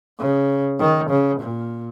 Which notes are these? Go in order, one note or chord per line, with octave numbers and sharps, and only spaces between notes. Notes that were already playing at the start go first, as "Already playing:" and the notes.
C#3
D#3
C#3
A#2